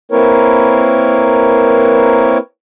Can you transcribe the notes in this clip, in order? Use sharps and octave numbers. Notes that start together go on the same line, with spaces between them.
A#3 C4 E4 A#4 B4 C#5